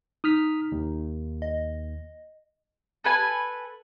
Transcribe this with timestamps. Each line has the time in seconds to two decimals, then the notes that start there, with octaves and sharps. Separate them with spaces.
0.24 D#4 D#6 F6 B6
0.72 D#2
1.42 D#5
3.04 A4 B4 G#5